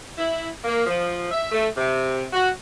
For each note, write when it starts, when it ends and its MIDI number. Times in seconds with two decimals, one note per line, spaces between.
0.17 0.47 64
0.64 0.86 58
0.87 1.30 53
1.31 1.52 76
1.52 1.67 57
1.77 2.26 48
2.32 2.50 66